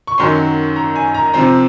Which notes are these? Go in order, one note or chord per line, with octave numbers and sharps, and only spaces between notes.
C#6
F#2 D#3 F#3 C#4 C6
A#5
G#5
A#5
C3 F3 C4 A#5